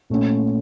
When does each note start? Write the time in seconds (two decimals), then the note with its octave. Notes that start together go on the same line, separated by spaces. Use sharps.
0.10 A#2 A3 C#4